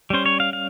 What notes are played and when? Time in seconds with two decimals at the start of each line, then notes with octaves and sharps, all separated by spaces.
0.10 G3 C#4 C5
0.26 C#5
0.40 F5
0.53 F5